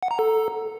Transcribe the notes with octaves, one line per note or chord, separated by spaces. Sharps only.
F#5
A#5
A4